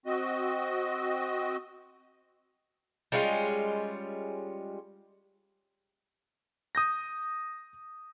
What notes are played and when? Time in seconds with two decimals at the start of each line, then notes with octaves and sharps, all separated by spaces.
0.06 C4 F#4 D#5
3.12 G3 G#3 C#4 F4
6.75 D#6 G6 A#6